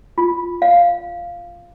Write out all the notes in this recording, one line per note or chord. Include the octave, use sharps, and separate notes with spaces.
F4
F5